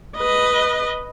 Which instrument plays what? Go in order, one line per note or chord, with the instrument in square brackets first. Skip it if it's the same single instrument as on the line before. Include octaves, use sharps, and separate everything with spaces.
[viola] B4 D#5